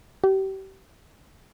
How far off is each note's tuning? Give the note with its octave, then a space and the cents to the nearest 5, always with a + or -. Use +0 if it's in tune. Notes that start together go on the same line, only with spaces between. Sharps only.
G4 -30